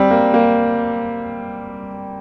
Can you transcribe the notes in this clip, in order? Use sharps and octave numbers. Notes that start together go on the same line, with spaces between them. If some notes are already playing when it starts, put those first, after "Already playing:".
Already playing: G3 C4
A#3
A#3